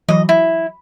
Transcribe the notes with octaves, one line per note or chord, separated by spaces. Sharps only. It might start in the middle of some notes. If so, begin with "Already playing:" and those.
E3 F#3 D#5
E4